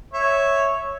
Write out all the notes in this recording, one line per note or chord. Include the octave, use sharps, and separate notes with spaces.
C#5 E5